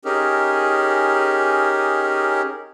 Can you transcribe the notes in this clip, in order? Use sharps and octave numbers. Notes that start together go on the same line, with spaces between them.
C#4 D#4 G4 G#4 A#4